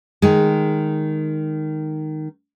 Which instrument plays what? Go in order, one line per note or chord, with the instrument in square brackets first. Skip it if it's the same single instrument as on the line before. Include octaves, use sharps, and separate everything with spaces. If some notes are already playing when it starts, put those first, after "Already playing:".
[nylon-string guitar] D#3 G#3